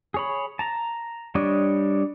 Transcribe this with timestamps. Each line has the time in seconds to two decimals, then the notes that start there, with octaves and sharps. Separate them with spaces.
0.14 G#4 C#5 B5
0.59 A5 A#5
1.35 G3 D4 C#5 D#5